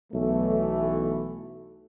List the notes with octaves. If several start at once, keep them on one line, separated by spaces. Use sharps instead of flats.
B1 E3 A3